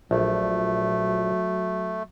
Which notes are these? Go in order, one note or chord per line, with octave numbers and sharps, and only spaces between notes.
A#1 F#3 A3